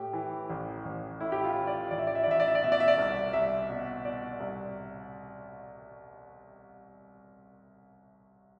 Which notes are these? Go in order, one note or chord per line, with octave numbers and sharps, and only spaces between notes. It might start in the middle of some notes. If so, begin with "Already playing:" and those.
Already playing: A2 G4
E3
A1
A1
A2 E4
G4
F4
E3
D5
A1 D5
E5
D5
E5
D5
A1 E5
D5
E5
D5
B2 E5
D5
E5
D5
C2
C2 E5
B2
B2 D5
C2